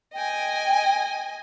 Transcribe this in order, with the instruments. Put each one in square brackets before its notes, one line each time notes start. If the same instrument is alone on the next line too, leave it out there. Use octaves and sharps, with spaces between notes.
[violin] D#5 G#5 [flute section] G5